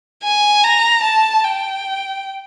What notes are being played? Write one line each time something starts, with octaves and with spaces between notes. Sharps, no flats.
G#5
A#5
A5
G5